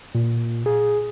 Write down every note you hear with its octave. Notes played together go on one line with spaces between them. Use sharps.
A#2
G#4